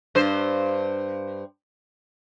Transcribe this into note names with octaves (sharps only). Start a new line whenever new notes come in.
G2 C5